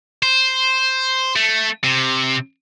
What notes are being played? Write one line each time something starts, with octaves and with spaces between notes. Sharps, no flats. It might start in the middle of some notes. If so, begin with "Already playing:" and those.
C5
A3
C3